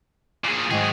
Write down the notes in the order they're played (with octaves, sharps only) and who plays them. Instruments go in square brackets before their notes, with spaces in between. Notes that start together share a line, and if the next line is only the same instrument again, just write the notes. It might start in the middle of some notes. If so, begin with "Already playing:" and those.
[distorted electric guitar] A#2 G#4
[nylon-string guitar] G#2 D#3 [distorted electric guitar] F#3 G#4